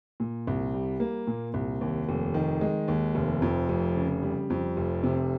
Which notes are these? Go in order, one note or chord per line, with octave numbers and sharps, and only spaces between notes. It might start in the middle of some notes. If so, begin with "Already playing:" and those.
A#2
C2
G3
A#3
A#2
C2
D#2
F1
D#3
G#3
D#2
F1
F2
F1
C#3
G3
F2
F1
C3